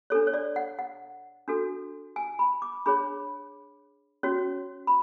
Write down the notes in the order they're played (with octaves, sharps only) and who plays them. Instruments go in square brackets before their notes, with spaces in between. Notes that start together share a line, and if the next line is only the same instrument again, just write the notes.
[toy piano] D4 A4 C#5
C#5
D5
F#5
F#5
D4 F#4 A4
G#5
B5
D6
D4 G#4 C#5 B5
C#4 F#4 C#5
B5